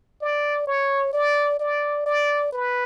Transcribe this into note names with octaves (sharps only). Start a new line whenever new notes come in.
D5
C#5
D5
D5
D5
B4